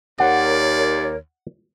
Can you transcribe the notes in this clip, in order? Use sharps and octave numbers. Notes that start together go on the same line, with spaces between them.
D#2 A#4 C#5 D5 F#5